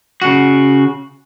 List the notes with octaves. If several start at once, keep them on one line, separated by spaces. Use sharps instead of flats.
C#3 F#4